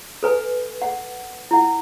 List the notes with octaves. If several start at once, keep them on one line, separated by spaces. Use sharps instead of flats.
A4 B4 G#5
F#5
E4 F#5